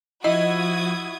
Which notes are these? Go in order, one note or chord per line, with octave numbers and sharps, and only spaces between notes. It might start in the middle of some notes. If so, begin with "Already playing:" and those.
F3 E4 F#4 D#5 D#6 G#6